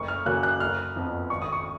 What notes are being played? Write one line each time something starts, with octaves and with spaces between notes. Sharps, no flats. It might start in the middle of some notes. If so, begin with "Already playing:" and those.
Already playing: F#1 C#6
F6
F#2 C#3 F#3 A#3 F#6
F#6
F#1 F6
F2 F3 B3
G#1 C#6
D#6
C#6